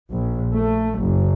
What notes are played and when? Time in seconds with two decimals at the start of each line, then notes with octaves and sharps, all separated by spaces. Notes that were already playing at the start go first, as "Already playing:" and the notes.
0.10 A#1
0.55 A3
1.00 F#1